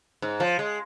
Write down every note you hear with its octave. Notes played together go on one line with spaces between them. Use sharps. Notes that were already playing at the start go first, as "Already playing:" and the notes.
G#2
F3
G#3